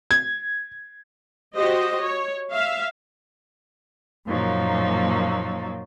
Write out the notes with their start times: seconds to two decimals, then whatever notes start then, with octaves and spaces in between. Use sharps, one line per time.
0.11 G#6
1.55 F#4 G4 C5 D#5
2.02 C#5
2.51 E5 F5
4.26 F#2 A#2 F3 F#3 A#3 D#4